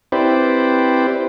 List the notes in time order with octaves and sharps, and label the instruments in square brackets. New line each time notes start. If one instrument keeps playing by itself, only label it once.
[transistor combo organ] C4 E4 G4 B4 C5 D5